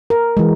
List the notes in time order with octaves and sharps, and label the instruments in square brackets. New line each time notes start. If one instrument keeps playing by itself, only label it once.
[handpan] A#4
E3 G#3